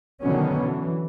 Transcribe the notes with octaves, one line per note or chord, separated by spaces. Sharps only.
B2 D3 D#3 F#3 B3 C#4
E3